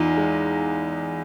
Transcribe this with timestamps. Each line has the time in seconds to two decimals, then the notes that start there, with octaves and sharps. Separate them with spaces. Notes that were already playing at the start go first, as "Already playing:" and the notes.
Already playing: E2 D#4 F4
0.17 G#3